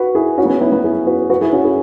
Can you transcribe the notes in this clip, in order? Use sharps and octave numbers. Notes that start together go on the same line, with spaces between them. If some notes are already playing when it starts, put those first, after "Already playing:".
Already playing: F#4 B4
E4 G#4
C#4 F#4
B3
C#4
B3 E4
B3
E4 G#4
F#4 B4
F#4 B4
E4 G#4
C#4 F#4
E4 G#4